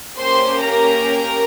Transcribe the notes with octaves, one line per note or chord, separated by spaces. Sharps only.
A#3 C#4 G4 C5 C6
A#4 A#5